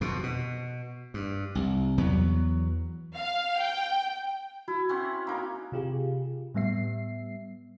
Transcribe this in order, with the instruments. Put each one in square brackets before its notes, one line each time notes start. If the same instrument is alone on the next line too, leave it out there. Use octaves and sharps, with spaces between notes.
[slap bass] F2 B2
B2
G2
C2
E2 F#3 B3
[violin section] F5
G5
[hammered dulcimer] E4 [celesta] F#4
[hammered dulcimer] C4 C#4 F#5
A#3 D#4 A#4
[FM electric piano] C3 F4 G4 G#4
A2 G3 B3 E5 C7